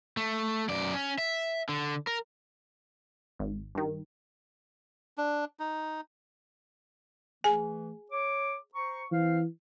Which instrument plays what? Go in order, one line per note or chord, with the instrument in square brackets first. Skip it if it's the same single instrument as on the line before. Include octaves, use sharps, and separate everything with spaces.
[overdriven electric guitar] A3
F#2 D5
C#4
E5
D3
A#4
[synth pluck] G#1
G2 D#3
[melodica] D4
D#4
[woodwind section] E3 A3 [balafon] G#4 G#5
[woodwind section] C#5 D6
C5 A#5 C#6
[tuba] E3 [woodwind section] C4 C5 F5